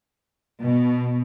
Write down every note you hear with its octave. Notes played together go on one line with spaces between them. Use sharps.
B2